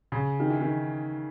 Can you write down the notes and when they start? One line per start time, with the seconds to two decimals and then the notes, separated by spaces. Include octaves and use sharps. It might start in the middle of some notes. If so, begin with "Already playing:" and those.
0.12 C#3
0.40 D#3
0.50 E3
0.61 D#3